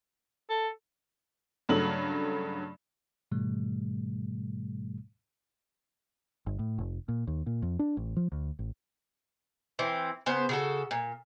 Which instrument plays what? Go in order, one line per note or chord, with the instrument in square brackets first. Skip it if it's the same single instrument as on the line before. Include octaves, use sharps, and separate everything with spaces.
[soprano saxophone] A4
[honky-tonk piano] G2 C#3 F#3 A3 F#7
[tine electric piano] G#2 B2 D#3 G3 A3
[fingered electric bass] G1
A2
F1
A#2
D#2
A#2
F2
D4
A1
F3
D2
A1
[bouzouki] E3 C4
C#3 B3 C5
C#3 F#4 A4
A#2